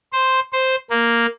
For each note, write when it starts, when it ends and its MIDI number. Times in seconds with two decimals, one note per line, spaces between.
0.13 0.40 72
0.53 0.76 72
0.90 1.27 58